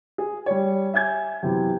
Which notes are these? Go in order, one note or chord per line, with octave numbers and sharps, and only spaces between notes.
G#4
G3 C#5
E5 G#5 G6 G#6
F#2 C3 E3 B3